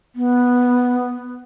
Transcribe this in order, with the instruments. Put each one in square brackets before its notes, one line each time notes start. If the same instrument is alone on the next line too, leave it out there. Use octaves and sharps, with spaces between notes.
[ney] B3